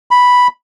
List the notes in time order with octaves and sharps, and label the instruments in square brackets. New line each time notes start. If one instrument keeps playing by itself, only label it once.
[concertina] B5